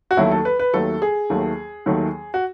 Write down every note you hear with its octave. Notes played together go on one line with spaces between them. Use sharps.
F#4
D#2 D#3 F#3 A3 E4
A4
B4
B4
D#2 D#3 F#3 A3 A4
G#4
D#2 D#3 F#3 A3
D#2 D#3 F#3 A3
F#4